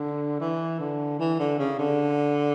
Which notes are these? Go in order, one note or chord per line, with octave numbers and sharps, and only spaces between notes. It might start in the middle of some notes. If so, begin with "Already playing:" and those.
Already playing: D3
E3
D3
E3
D3
C#3
D3